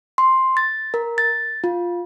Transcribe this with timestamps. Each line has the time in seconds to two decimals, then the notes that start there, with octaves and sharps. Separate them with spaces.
0.18 C6
0.57 A6
0.94 A#4
1.18 A6
1.64 F4